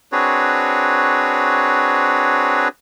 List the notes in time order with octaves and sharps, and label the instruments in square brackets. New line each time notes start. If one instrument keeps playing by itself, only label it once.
[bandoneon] C4 D4 F#4 G#4 B4 C#5